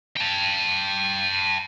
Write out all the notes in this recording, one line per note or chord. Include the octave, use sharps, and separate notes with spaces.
G5 A5